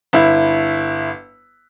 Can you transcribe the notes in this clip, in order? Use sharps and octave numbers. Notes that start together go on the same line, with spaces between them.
G1 E4